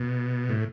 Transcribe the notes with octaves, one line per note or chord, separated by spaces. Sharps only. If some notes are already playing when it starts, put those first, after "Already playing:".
Already playing: B2
A2